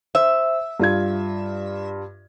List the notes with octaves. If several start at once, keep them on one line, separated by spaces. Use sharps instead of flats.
C5 E5
G2 F4 G#6